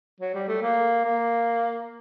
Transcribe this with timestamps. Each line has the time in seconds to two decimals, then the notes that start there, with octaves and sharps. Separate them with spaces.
0.20 F#3
0.34 G3
0.48 A3
0.62 A#3
1.05 A#3